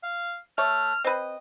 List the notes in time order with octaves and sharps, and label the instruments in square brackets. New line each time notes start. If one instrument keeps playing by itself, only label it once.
[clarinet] F5
[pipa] A3 C#5 [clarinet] F6
[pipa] C4 B4 [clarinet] D#5